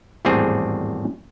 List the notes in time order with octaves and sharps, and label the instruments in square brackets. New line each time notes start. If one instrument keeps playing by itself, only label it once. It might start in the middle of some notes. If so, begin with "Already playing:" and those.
[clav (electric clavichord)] G#1 E2 A2 G3 C4 G#4